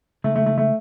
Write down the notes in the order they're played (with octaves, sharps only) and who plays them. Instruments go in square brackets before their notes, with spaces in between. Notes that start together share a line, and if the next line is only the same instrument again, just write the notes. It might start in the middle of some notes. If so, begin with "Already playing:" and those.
[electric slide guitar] C#3 G#3 D#4 [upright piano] A3
[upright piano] A3
A3
A3